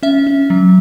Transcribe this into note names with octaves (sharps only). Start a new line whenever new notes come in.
C#4 E5
C#4
F#3